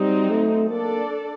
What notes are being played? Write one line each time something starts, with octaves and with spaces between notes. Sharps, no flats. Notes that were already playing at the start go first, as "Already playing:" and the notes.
Already playing: F#3 G3 C4 D#4
A3
A#3 D4 A4 D5